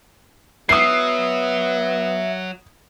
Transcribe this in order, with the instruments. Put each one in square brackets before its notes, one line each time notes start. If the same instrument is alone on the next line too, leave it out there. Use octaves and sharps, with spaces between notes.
[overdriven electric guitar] F#3 [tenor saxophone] B3 [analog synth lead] E5 [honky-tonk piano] D#6 C7